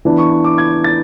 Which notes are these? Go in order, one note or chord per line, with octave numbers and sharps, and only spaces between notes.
E3 B3 D4
C#6
C#6
D6
G#6
A6